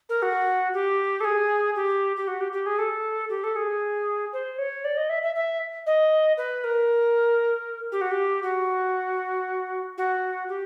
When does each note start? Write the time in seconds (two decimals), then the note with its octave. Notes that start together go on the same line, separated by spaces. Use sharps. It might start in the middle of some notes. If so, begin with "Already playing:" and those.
0.09 A#4
0.22 F#4
0.73 G4
1.20 A4
1.24 G#4
1.75 G4
2.16 G4
2.27 F#4
2.40 G4
2.52 G4
2.65 G#4
2.78 A4
3.29 G4
3.43 A4
3.55 G#4
4.32 C5
4.58 C#5
4.84 D5
4.96 D#5
5.09 E5
5.22 E5
5.35 E5
5.86 D#5
6.37 B4
6.63 A#4
7.91 G4
8.01 F#4
8.11 G4
8.42 F#4
9.97 F#4
10.48 G4